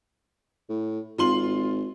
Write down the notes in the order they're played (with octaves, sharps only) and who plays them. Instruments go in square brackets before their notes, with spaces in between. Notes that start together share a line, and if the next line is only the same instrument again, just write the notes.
[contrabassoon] A2
[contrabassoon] G#1 [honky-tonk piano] F4 C6 F#7